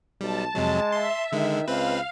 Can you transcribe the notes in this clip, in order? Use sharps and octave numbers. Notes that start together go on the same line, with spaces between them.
B1 G3 A5
F2 C3 F#3 G#3
E5 C6
D3 D#3 G#3
C#2 C4 B4 F5